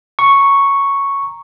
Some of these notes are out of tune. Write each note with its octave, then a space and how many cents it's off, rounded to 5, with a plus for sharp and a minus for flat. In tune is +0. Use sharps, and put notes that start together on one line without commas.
A#5 +0 C#6 +0